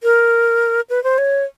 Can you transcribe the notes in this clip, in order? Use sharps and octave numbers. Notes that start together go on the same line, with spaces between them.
A#4
B4
C5
C#5